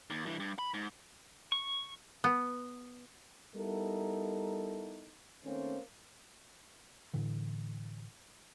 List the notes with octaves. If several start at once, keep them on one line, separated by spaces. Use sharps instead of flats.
D#2
G2 E3
G2
B5
G#2
C#6
B3
G3 B3 D#4 E4 A4 A#4
D#3 A3 A#3 C4 C#4
A2 D3 E3